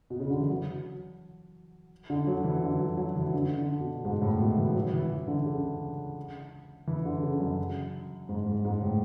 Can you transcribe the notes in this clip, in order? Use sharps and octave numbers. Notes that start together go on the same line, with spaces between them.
B2
C#3
D3
E3
F#3
D3
F#3
E3
D3
F#3
F#3
E3
D3
D3
B2
G#2
A2
B2
E3
F#3
E3
E3
D3
C#3
E3
D3
C#3
F#2
G#2
G#2
G#2
A2